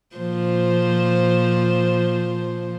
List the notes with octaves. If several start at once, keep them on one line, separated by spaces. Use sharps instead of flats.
A#2 F3 C5